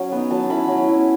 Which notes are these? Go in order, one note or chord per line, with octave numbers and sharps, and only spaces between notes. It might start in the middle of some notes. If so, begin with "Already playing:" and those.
Already playing: F#3 C#4
B3 D#4
F#3 A5
C#4 E4 B5
F#3
C#4 E4